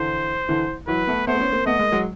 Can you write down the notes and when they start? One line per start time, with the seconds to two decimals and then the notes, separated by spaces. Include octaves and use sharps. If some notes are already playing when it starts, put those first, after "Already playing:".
Already playing: D3 E3 C5
0.49 D3 E3
0.88 E3 F#3 B4
1.07 A3 B3
1.27 A3 B3 C5
1.35 C4
1.40 B3 C#4
1.52 A#3 C4
1.65 A3 B3 D#5
1.79 G#3 A#3
1.92 F#3 G#3